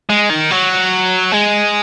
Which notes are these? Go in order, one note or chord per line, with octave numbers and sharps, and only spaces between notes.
G#3
D#3
F#3
G#3